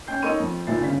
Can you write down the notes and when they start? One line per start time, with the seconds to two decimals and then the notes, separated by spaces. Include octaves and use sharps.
0.07 C#4 G5 G6 C7
0.23 D#4 A4 A#4 C#5 C#6 D#7
0.40 F2
0.67 D#2 A#2 E4 A6 C7
0.80 G1 C#3 C#4 B6